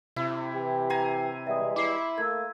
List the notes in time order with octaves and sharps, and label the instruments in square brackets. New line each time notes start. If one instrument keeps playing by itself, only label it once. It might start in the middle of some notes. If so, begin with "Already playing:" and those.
[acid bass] C3 [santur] E4
[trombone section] E3 G4
[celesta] F#5 [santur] G#5 A#5 C6
[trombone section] E3 G3 G#3 [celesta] E5 F#5 D#6
[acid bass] E4 [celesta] D6 C7
[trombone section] A3 A#3 [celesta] E6 G#6